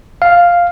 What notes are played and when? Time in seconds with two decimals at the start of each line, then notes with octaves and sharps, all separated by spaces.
0.22 F5